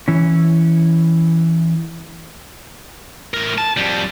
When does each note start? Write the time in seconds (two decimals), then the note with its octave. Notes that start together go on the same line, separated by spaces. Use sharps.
0.08 E3 C#4
3.34 A2 A#4
3.58 A5
3.77 F2 G3